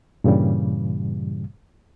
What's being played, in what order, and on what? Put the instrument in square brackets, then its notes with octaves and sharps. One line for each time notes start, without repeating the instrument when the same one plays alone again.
[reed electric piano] G2 A#2 C#3 E3 G3